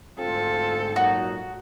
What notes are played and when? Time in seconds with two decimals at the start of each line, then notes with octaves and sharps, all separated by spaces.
0.19 D2 G#2 C4 F4 A4
0.96 A#2 F#3 D#4 F#4